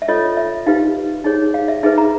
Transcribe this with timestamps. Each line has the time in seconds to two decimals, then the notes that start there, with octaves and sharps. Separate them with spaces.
0.02 E5
0.08 F4 A4 C#5 D#5
0.37 E5
0.66 D#4 G4 B4 F5
1.24 D#4 G#4 C#5
1.54 F5
1.68 E5
1.83 D#4 G#4 B4 E5
1.98 A#5